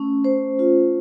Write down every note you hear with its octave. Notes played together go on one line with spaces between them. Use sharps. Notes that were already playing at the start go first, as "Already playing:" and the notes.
Already playing: A3 C#4
C5
F4